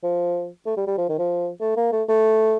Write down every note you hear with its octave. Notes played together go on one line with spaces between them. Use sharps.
F3
A3
G3
G3
F3
D#3
F3
A3
A#3
A3
A3